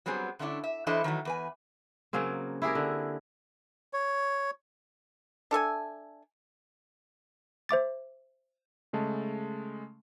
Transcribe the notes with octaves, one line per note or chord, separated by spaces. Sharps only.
F#3 G3 B3 C4 G#4
D3 A3 C#4 D4 E4
E5
E3 D4 E4 A4 C5 D#5
D#3 E3 F#3 A3
E2 B4 G#5
C#3 F#3 A#3 C4
E4 G4 G#4 A#4
D3
C#5
D4 A4 E5 G#5
C5 E5 D6 A6
C#3 G#3 A3 A5